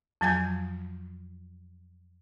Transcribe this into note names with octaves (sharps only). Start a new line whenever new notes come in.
F2 F3 F#3 G#5 G6 G#6